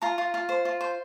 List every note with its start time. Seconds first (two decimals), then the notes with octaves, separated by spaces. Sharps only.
0.02 F4 A#5
0.18 F4
0.34 F4
0.49 C5
0.65 F4
0.81 C5